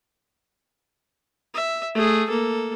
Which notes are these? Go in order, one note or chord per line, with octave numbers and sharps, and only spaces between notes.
E5
A3 G#4
A#3 A4